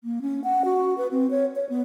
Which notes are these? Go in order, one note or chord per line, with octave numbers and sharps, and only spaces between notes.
A#3
C#4
F#5
F#4
B4
C4
C#5
C#5
B3